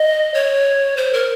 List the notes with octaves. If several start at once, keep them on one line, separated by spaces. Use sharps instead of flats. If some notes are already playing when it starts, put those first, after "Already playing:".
Already playing: D#5
C#5
C5
A#4